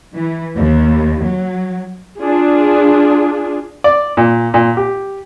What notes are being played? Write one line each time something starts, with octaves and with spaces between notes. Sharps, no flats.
E3
D#2
F#3
D4 F4 G#4
D5
A#2
A#2
G4